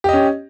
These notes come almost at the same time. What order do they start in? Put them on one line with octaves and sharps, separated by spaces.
G4 D#5 C#4